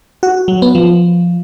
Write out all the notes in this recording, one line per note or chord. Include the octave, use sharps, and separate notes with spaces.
F#4
F#3
B3
F3